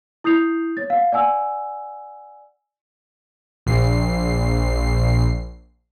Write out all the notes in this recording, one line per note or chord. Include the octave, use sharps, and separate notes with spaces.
E4 D#6 G6 C7 F7
C#5 A6
F5 F#5
D5 F#5 G#5 E6
A#1 C7